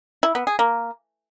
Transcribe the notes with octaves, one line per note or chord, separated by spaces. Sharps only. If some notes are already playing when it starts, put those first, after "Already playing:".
E4
B3
G#4
A#3